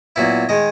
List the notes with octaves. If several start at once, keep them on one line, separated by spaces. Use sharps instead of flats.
A#2 F#3 B3 E4
D#3 G#3 D#5